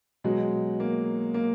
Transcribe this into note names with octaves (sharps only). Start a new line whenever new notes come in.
B2 F#3 G#3
A#3
A#3